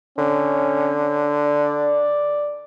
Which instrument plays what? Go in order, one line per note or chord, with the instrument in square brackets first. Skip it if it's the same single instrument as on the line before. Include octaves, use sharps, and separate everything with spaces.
[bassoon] D3 [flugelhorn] C#4
[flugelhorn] D5